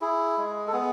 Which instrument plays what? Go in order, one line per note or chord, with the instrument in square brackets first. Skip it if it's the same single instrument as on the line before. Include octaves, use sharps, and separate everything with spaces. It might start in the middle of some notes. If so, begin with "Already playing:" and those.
[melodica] E4 G#4
G#3
A4
B3 G#4